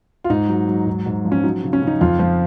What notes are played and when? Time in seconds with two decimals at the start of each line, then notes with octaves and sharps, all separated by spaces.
0.24 F4
0.30 G#2 D#4
0.49 F#3
0.68 F#3
0.86 G#2
1.06 G#2
1.25 F3
1.32 C#4
1.44 F#3 D#4
1.63 C#3
1.73 C#4
1.82 C#3
1.87 D#4
2.01 F2 F4
2.19 F3